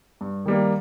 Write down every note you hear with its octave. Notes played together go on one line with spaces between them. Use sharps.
G2
D#3 G3 A#3